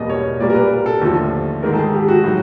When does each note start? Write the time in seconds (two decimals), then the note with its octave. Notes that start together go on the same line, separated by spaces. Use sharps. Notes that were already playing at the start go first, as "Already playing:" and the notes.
Already playing: E2 B2 G3 A#3 D#5
0.10 C#5
0.39 A#2 G3 A#3 D5
0.50 A#4
0.55 B4
0.71 A#4
0.86 A4
1.01 D#2 D3 F3 A3
1.63 G#2 D#3 G#3 A#4
1.73 A4
1.78 G#4
1.94 G4
2.08 F#4
2.24 A2 F#3